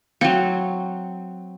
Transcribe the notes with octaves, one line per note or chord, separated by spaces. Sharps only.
F#3 C4 F5 G5